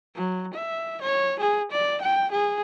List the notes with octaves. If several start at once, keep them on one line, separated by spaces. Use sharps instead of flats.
F#3
E5
C#5
G#4
D5
G5
G#4